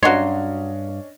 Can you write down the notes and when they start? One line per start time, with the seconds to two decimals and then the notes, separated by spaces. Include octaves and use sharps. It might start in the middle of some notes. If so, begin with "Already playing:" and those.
0.03 G2 F#3 C#4 D4 F#4 C#5 D#5 C6